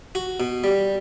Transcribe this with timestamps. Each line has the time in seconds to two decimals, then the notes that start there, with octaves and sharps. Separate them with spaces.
0.15 F#4
0.40 B2
0.64 G3